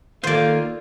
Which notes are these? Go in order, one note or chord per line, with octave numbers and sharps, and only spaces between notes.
D#3 A#3 F4 A4 C5 D5